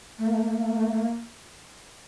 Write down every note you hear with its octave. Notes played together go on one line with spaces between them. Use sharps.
A3
A#3
A3
A#3
A3
A#3
A3
A#3
A3
A#3
A3
A#3